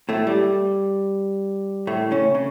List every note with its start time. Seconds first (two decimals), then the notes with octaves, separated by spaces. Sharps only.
0.09 A2 A3
0.27 G3
1.87 A2 A3
2.11 C#3 C#4
2.35 C#3